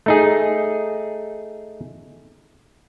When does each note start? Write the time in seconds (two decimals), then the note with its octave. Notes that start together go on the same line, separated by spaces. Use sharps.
0.06 A3 D#4 G#4